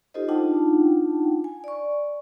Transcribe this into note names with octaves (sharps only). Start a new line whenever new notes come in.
D#4 F4 G4 A4 C5 D#5
D4 D#4 F4 F#5 G5 A5
G#5
D5 C#6